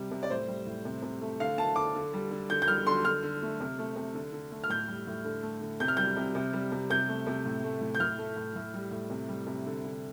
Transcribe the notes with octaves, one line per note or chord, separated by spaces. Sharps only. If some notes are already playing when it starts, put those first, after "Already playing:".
Already playing: C3 G3
C3
D5
A2 C5
G3
A2
C3
C3
A3
D3 F5
A3 A5
D3 D6
D3
G3
D3
D3 G6
G6
G3 F6
D3 C6
D3 F6
D3
A3
C3
A3
C3
D3
D3
A3
F6
A2 G6
G3
A2
D3
A3
D3
C3 G6
F6
G3 G6
C3
C3
G3
C3
C3 G6
A3
C3
A2
A3
A2
G6
A2 F6
A3
A2
A2
G3
A2
C3
G3
C3
D3
D3